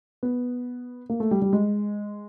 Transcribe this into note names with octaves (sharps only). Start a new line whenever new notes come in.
B3
A#3
A3
G3
G3
G#3